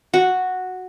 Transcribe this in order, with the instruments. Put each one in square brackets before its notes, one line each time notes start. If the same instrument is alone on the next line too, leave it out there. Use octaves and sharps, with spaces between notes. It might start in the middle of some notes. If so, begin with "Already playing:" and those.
[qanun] F#4